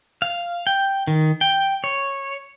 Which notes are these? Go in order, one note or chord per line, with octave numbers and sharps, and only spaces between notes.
F5
G5
D#3
G5
C#5